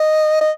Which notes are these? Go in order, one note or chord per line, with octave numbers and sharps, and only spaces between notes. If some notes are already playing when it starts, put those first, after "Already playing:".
Already playing: D#5
D#5